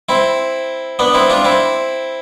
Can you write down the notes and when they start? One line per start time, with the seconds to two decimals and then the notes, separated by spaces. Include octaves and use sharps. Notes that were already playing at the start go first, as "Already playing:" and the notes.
0.09 C4 E4
0.99 B3 D4
1.14 C4 E4
1.30 D4 F4
1.45 C4 E4